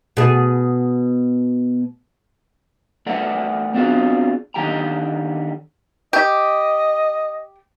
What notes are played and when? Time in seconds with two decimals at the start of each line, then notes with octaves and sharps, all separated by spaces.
0.17 B2 G#4
3.06 A3 A4 B4 D5 F#5
3.74 B3 C4 D4 F4 F#4 G#4
4.54 D3 D#3 G4 G5 A#5
6.13 G4 D#5